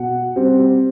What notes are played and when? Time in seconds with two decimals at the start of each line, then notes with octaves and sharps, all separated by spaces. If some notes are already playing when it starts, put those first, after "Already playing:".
Already playing: B2 F#5
0.36 G3 C4